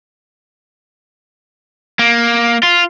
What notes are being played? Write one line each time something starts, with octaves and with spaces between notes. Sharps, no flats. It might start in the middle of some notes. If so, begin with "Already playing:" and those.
A#3
F4